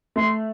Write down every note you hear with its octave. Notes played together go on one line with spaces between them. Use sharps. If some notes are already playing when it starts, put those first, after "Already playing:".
A3 C6